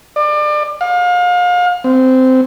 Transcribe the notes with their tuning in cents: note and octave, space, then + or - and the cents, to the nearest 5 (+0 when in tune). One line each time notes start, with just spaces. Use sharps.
D5 +30
F5 +35
C4 -15